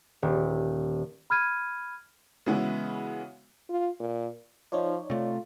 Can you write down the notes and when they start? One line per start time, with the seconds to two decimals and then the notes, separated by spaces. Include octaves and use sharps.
0.22 D#1
1.30 B5 F6 G#6 D#7
2.46 C#3 E3 G#3 B3 E4 F#4
3.69 F4
4.00 A#2
4.72 F3 D#4 C#5 D5
5.10 C3 A3 F4